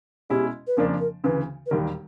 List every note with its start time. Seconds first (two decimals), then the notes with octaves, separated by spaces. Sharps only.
0.30 B2 G#3 C#4 E4 G4
0.67 B4
0.77 F2 C#3 F3 A#3 D4 A#4
1.00 A#4
1.24 D2 C#3 E3 B4
1.66 B4
1.70 E1 D#2 D#3 G3 A#4